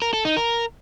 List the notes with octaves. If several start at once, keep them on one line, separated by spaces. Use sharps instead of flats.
A#4
A4
D#4
A#4